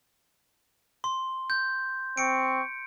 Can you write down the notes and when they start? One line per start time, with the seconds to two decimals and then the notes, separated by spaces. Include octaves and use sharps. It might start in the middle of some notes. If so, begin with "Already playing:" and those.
1.04 C6
1.50 G6
2.17 C4 C#6 C#7 D7